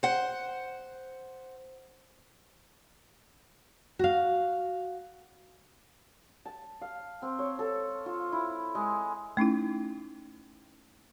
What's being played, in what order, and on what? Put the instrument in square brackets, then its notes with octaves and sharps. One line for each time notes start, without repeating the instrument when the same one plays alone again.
[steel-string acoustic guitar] C5 F#5
[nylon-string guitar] F#4 F5
[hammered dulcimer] A5
F5
C4
C#5
A4
F4
E4
G#3
[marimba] A3 C#4 D#4 E4